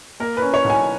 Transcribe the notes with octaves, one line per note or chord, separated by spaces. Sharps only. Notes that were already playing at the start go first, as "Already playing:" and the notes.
A#3 A#4
B4
C#4
C#5
B1
G#5